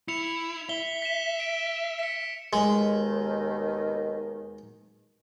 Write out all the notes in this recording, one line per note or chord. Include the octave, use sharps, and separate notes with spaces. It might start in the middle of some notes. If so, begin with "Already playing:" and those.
E4 C#7 F7
E5 G7
B6 E7
D7
B6 C#7
D#2 B2 D#3 G#3